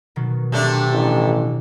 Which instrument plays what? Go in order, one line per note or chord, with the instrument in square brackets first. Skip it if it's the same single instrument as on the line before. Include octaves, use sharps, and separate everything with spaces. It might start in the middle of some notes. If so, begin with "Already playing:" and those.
[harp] B2 D#3 F#3
[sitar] C3 A3 D4
[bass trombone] A1